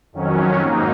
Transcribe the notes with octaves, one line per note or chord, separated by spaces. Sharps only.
F2 D#3 F#3 C#4
G#2 F#3 A#3 D#4